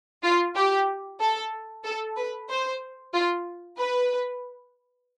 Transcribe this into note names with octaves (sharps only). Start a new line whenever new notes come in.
F4
G4
A4
A4
B4
C5
F4
B4